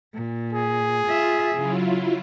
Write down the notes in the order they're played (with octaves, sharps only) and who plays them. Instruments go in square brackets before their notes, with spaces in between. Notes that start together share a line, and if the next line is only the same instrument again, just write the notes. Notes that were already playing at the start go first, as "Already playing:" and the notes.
[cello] A#2
[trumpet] G#4
[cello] F4 E5
[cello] C#3 [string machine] F#3 E4 F4